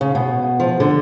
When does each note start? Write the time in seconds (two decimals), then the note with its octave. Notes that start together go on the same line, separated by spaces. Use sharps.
0.01 C#3
0.15 B2
0.60 F3
0.80 D3